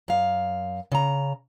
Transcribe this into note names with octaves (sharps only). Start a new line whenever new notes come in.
F#2 F5
C#3 A#5